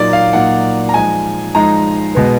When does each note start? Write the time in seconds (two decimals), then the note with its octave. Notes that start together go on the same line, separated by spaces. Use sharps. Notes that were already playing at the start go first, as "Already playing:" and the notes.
Already playing: A#2 F#3 A#3 D#4 D5
0.13 F5
0.33 A#2 F#3 A#3 D#4 F#5
0.89 A#5
0.93 F3 G#3 D#4 G#5
1.54 F3 G#3 D#4 A#5
2.15 B2 G#3 B3